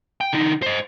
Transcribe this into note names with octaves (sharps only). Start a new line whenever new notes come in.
G5
D3 D#4
C5 D#5